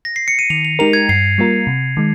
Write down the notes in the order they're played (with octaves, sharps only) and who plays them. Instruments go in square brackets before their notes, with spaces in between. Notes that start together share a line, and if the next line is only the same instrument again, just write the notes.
[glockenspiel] A#6
C7
C#7
D#7
[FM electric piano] D#3 [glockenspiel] F7
[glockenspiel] F7
[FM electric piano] G#3 D#4 G4 A#4 [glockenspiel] F7
[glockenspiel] G#6
[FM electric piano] G2 [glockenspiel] C7
[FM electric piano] G3 A#3 F4 A#4
C3
D#3 G#3